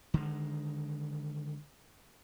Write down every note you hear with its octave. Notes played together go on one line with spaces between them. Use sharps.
D3 D#3 G#3